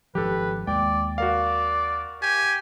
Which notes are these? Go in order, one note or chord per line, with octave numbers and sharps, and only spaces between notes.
G#1 F3 G4 A4 B4
D#2 G#3 D5 G5
F#4 A#4 D5 F5
G4 G#5